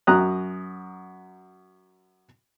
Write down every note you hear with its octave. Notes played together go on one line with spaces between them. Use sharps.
F#2 A#5 D#6 F#6